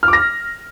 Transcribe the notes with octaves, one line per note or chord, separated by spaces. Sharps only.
F6
D6
A#6